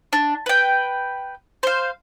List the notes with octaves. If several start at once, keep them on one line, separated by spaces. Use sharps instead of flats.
D4
B4 G5
C5 F5